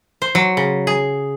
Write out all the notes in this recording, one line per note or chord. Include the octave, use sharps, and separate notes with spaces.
C5
F#3
C#3
G#4